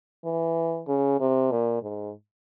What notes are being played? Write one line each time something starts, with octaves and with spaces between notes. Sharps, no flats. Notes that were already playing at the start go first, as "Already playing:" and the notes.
E3
C#3
C3
A#2
G#2